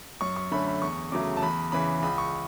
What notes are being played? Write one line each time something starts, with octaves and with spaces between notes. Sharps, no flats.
F#2 C#6
C#6
D3 A3 C#4 B5
B5
E2 C#6
C#3 F#3 A3 D6
A5
E2 B5
C#3 E3 B5
C#2 B5
C#6